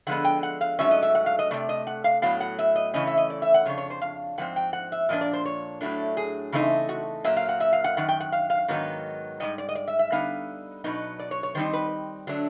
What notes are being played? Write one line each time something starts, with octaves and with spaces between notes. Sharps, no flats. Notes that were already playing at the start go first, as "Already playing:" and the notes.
D3 F3 G#3 B3 F#5
G5
F#5
F5
G#2 D#3 F#3 A3 C#4 E5
D#5
E5
F#5
F5
D#5
C3 E3 A3 D5
D#5
F#5
F5
A2 F#3 B3 F5
F#5
E5
D#5
C#3 E3 A3 C#4 D#5
E5
D#5
D5
E5
F#5
F2 C#3 D4 C#5
C#5
C5
F5
G#2 F3 C4 F#5
G5
F#5
E5
A#2 F3 A#3 D4 D#5
D5
C5
C#5
A2 F#3 A3 D4
G#4
C#3 E3 A3 C4 D#4
F#4
A#2 F#3 A#3 E5
F5
F#5
E5
F5
F#5
F#2 D#3 F#5
G5
F#5
F5
F5
G#2 D#3 F#3 B3 D#4
G#2 E3 G3 D#5
D5
D#5
D5
E5
E5
D3 G3 B3 D#4 F5
B2 F#3 B3 D#4
D5
C#5
C#5
D#3 G3 C4 D#4 C5
B4
D3 F#3 A3 D4